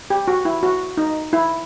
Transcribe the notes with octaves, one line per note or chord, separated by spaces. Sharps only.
G4
F#4
E4
F#4
D#4
E4